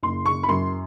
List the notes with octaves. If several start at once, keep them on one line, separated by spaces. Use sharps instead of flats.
F#1 C6
C#6
B5
F#2 C6